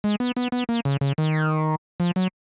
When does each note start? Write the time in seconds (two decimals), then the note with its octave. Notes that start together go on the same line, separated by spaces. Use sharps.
0.04 G#3
0.20 B3
0.37 B3
0.52 B3
0.69 A#3
0.85 C#3
1.01 C#3
1.18 D#3
2.00 F3
2.16 F#3